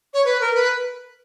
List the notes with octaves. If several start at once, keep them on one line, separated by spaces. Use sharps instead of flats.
C#5
B4
A#4
B4